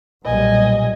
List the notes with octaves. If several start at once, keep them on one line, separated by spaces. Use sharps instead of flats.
B1 A#2 G3 D#5 G#5